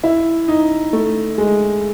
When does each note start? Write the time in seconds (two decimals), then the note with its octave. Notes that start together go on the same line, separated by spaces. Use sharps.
0.04 E4
0.48 D#4
0.93 A3
1.38 G#3